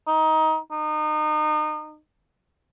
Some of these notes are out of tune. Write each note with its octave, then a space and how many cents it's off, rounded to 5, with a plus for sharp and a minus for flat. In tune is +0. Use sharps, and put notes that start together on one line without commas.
D#4 +20
D#4 -30